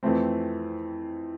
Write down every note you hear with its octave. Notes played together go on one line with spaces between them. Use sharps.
F2 E3 A3 C4